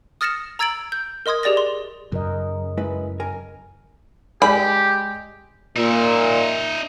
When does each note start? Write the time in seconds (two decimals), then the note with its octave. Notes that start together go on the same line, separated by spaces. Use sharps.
0.21 D#6 F6 A6 A#6 C#7 E7
0.59 A#5 E6 G#6 A6 D7 F#7
0.92 G6
1.26 A#4 D#5 C6 D#6 G#6
1.43 G4 G#4 D5 A6 A#6
1.57 C6
2.12 F#2 C#3 A#4 D#5
2.77 G#3 E4 B4
3.20 A#4 G#5
4.42 G#3 G4 D5 B5
5.76 A#2 D#4 E5